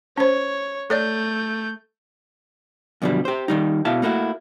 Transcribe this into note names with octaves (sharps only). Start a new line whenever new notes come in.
C#4 C5 C#5
A3 A4 C#5 D5 G6
F#2 B2 D3 F3 G3
G4 C5
D#3 G3 D#4
B2 E4 E5 F5 A5
A3 A#3 D#4 E4 F#4